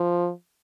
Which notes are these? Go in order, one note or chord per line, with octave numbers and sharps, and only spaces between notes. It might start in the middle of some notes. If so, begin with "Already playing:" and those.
Already playing: F3